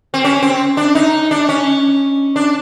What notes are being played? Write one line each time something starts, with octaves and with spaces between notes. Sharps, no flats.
C4
C#4
C4
D4
D#4
D4
C#4
D4